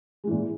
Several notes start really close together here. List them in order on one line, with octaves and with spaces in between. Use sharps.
G#3 E3 A#2